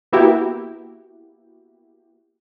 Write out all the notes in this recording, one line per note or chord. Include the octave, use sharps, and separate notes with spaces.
A#3 B3 E4 F#4 G4